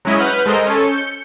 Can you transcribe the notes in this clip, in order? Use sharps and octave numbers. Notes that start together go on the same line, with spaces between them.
F#3 G#3 C#4 E4 D#5
B4 F#5 F6 G6
G#3 A4 A#4 C5 D#5
C#4 A4
G6 C#7